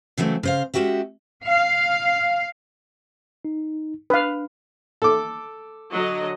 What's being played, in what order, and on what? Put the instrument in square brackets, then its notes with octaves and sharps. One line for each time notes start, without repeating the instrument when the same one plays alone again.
[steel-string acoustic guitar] C#3 E3 F#3 A3 C4
C#3 C5 F5
G#3 C#4 F#4 G4 E5
[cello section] F5
[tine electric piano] D#4
[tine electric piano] D4 [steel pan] B4 F5
[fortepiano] A4 D6
[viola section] D3 F#3 D#5